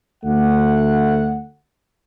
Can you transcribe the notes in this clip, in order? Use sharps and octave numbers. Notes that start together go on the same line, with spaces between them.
D2 A3 F#5